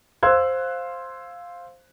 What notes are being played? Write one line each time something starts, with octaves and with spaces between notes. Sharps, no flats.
C5 F5 C6 E6 F#6 G#6